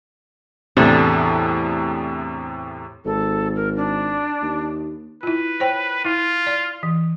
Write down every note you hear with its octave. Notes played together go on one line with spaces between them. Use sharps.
E2 A2 C3 D4 A4 E5
G#1 A4
A#4
D4
D#2
E4 F4 B4
C5 C#5 G5
E4 F4
D5
E3